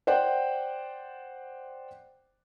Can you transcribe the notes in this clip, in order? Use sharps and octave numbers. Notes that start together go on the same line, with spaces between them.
C5 D5 F#5 G5